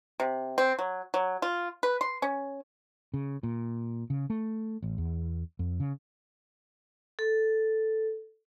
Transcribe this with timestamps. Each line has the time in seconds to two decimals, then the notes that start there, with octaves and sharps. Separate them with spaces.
0.20 C3
0.58 C4
0.79 F#3
1.14 F#3
1.42 F4
1.83 B4
2.01 C6
2.22 C#4
3.14 C#3
3.43 A#2
4.10 C#3
4.30 A3
4.82 A1
4.98 E2
5.59 F2
5.80 C#3
7.19 A4